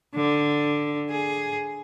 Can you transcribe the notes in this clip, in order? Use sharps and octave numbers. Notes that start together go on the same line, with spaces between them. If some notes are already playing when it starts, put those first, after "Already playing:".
D3
G#4